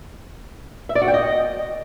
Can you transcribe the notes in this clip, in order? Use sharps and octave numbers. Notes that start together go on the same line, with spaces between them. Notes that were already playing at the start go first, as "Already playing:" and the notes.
E5
D5
F#4
G5
D#5